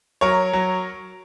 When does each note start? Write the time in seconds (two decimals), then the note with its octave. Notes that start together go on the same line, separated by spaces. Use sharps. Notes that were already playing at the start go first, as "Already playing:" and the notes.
0.21 F#3 A#4 C#5
0.53 F#3